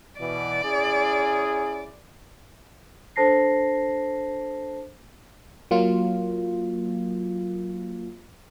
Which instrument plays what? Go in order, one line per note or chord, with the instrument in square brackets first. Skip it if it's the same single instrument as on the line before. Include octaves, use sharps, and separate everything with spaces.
[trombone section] B2 E3 [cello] D5
[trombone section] C#4 E4 G#4
[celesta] D4 A4 C5 A5 A#6 C7
[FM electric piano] F#3 A#3 F4